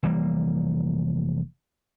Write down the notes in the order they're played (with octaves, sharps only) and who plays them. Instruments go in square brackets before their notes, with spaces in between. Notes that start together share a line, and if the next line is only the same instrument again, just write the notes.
[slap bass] F1 E3 G3 A#3